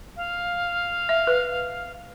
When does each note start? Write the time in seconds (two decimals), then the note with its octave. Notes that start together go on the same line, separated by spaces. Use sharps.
0.16 F5
1.09 E5
1.27 B4